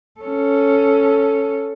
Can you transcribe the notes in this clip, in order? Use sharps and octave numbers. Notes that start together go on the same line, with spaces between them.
C#4 A4